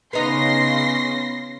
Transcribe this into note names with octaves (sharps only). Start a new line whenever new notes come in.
C#3 B3 C#4 D#4 C6 A#6 C7